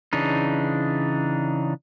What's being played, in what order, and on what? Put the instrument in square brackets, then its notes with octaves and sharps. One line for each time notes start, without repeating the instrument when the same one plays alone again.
[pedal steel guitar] C#3 E3 D4 D#4